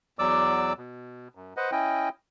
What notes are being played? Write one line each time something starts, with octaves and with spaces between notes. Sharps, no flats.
E2 F#3 D5 D6 E6
B2
F#2
B4 C5 D#5 F#5
C#4 E4 D#5 G5